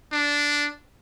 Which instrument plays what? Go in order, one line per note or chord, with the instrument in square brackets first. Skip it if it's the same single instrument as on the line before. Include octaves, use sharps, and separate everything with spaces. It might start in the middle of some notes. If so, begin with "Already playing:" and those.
[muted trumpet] D4